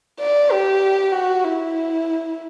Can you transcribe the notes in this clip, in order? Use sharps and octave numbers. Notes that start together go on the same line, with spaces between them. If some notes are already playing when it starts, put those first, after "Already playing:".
D5
G4
F#4
E4